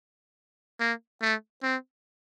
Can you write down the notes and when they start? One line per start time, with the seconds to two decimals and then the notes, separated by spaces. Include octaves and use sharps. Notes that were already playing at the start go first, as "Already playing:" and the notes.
0.80 A#3
1.22 A3
1.63 C4